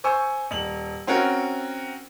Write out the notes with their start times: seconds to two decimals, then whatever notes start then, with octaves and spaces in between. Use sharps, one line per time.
0.04 C5 G#5 C#6 E6
0.51 D#1 F#7
1.07 C4 C#4 F#4 A#4